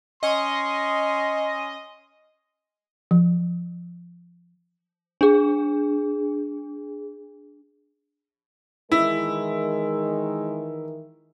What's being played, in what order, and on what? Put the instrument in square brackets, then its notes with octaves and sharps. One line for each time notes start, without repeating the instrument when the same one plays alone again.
[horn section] C#4 C6 [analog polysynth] D#5
[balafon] F3
[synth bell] D4 G#4
[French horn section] D#3 E3 A#4 [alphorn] G#3 [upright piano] E4